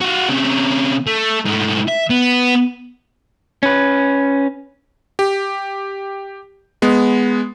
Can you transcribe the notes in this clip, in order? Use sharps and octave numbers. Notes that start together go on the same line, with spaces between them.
F4 F#4
C3 C#4
A3
G#2 A3
E5
B3
C#4 B4
G4
G#3 B3